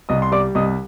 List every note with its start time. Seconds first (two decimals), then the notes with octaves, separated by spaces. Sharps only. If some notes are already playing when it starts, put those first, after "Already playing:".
0.09 C2 D#5 D#6
0.22 C6
0.31 G3 D5 D6
0.55 C2 D#5 D#6